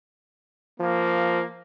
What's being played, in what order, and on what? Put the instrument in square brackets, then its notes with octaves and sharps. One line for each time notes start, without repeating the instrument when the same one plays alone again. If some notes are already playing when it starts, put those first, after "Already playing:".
[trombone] F3 [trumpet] A#3